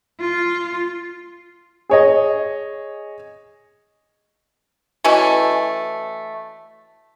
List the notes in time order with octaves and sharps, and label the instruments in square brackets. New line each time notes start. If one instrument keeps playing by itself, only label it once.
[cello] F4
[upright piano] G#4 C#5 D#5
[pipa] E3 A3 C#4 [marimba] F#4 D#5 A5